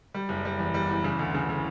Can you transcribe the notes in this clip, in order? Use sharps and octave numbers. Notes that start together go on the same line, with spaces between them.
G3
F#1
G3
E2
G3
E2
C#3
D2
C#3
C#3